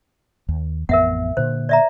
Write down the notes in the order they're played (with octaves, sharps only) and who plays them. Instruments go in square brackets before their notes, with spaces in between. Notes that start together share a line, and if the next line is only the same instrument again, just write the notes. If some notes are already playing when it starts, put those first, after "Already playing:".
[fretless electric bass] D#2
[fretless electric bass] A1 F2 B3 [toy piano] A#4 E5 F#5
[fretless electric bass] A#2 D3 [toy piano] C5
[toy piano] D5 E5 A#5